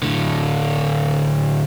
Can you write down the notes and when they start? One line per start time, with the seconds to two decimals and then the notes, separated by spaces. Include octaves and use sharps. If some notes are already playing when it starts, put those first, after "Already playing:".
0.03 A2 D3